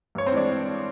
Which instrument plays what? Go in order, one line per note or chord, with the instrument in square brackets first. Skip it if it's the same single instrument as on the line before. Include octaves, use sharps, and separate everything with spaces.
[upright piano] G2 C#5
C4 C5
E3 G#3 D4 D5